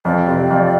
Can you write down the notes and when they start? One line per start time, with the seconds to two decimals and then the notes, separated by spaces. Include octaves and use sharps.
0.05 F2 D5
0.28 C3
0.50 F2